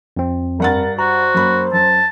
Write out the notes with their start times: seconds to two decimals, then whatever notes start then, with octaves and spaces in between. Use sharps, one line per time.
0.17 F2 C4
0.60 G2 A#4 F#5 A6
0.99 F#4 C5 A#5
1.34 F#2 A#3 B5
1.73 F#2 A5